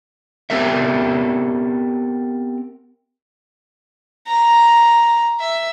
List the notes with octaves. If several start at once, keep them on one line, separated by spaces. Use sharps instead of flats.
B3 C4 G4 A4 A#4 E5
A#5
E5